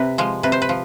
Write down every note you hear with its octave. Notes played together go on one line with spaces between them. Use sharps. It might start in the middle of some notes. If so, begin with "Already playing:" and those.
Already playing: C3 B4
F3 G#3
C3 B4
C5
B4
F3